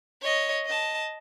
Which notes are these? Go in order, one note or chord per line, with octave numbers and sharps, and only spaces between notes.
C#5 D#5
D#5 A5